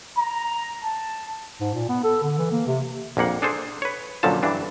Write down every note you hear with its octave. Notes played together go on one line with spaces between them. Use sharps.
A#5
A5
G#2
A#2
B3
A4
D3
E3
A#3
C3
A#1 F2 A#3 F#5
D4 G#4 A4 C5
B4 C#5
F#2 A#2 D3 F3 F#3 A5
G2 E3 D4